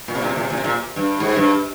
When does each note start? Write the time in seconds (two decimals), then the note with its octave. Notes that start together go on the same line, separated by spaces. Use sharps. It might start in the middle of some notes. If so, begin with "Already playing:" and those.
0.08 A#2
0.15 C3
0.22 A#2
0.29 C3
0.36 A#2
0.43 C3
0.50 A#2
0.57 C3
0.64 A#2
0.96 G2
1.20 G#2
1.36 G2